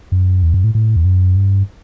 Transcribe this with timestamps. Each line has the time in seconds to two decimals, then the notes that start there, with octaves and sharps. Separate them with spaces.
0.12 F#2
0.43 E2
0.54 F#2
0.64 A2
0.75 A2
0.96 E2
1.05 F#2
1.36 G2